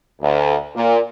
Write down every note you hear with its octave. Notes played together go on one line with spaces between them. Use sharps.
D2
A#2